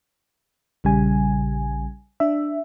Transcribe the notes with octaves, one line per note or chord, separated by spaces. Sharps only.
A#1 C#3 G3 G#5
D4 E5